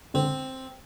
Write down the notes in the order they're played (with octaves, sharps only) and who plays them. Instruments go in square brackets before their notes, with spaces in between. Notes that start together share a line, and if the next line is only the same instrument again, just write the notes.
[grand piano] D3 [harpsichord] C4